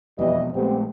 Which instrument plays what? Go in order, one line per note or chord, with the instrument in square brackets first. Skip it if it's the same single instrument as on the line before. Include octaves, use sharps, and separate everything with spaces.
[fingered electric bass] E1 F2 B2 [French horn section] E3 G3 D#5
[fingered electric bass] A#1 G#3 A3 [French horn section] B3 C4 G4